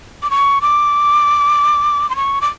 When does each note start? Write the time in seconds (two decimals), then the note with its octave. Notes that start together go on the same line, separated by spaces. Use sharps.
0.23 D6
0.31 C#6
0.62 D6
2.10 C6
2.16 C#6
2.41 D6